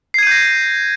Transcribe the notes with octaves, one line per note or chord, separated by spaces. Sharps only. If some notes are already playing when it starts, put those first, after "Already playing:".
G6 G#6 A#6 C7 D#7